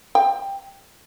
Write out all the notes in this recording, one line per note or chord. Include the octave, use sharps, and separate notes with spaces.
G5